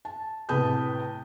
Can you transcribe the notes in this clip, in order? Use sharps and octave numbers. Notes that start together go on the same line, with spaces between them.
A5
A2 C3 B4 A5 D#6 G6